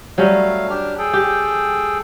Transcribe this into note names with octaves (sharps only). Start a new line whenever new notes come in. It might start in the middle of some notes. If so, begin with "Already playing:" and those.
F#3 G3 A3 C#4 F5
D4 G4 F6
G#4 A4 G5
G4